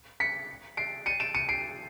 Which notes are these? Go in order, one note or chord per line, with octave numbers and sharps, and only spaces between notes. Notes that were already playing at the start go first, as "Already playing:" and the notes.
B6 C#7
C7 D7
C#7 D#7
D7 E7
C#7 D#7
C7 D7